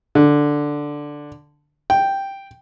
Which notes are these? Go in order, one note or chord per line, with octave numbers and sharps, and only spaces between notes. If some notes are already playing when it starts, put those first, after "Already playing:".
D3
G5